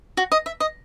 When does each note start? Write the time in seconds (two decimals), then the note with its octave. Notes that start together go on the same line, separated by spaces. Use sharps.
0.17 F#4
0.32 D#5
0.46 E5
0.60 D#5